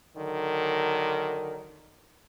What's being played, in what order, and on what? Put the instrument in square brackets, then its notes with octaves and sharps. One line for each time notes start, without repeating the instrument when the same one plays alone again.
[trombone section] D3 D#3 F#3 A#4